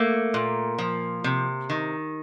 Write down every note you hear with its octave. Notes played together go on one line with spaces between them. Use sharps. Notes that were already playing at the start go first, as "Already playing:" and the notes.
Already playing: A3 A#3
A#2
F3
C3
D#3